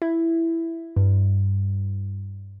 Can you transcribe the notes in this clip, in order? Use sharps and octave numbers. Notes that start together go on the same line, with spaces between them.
E4
G2